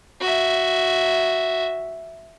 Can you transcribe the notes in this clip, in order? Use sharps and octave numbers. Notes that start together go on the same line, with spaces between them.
F#4 E5